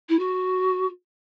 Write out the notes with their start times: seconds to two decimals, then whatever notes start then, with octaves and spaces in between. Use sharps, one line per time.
0.09 E4
0.19 F#4